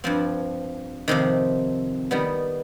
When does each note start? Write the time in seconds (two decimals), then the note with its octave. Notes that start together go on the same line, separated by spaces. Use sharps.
0.04 G2 F3 C4
1.08 F2 C3 D#3
2.11 D#3 G3 B3